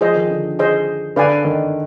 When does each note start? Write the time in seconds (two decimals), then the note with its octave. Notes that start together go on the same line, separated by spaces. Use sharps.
0.01 F3 G#4 C5 D#5
0.15 D#3
0.30 D3
0.59 G#4 C5 D#5
1.16 D3 B4 D5 F5 G#5
1.45 D#3